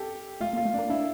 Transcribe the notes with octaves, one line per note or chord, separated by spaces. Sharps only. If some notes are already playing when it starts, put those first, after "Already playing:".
Already playing: G4 A4
A3 F4
A#3
F4
A3
A#3 D4
D4 E4